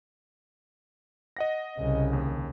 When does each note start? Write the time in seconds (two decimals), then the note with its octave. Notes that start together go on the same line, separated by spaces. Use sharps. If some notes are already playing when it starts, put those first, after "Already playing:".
1.37 D#5 F#5 A#6
1.78 C2 C#3
2.13 D#2